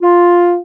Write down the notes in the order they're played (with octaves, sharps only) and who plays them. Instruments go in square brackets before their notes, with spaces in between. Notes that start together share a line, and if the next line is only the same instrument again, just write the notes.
[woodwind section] F4